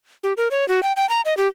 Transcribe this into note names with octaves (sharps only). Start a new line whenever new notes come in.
G4
A#4
C#5
F#4
G5
G5
A#5
D#5
G4